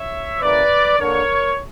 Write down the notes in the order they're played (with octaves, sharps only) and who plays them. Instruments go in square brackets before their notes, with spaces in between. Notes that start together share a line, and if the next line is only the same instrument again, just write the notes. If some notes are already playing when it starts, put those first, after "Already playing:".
Already playing: [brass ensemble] C#5 E5
C#3 E3 A#3 B4 D5
D3 A#3 D4 A#4 C#5